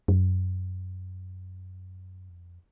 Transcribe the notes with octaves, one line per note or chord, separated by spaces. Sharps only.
F#2
F2